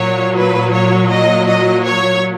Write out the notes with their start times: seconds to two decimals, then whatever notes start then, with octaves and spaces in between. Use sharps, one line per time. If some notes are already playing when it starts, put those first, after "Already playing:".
Already playing: A#2 F#3 C#5
0.37 B4
0.74 C#5
1.11 D#5
1.48 D#5
1.84 C#5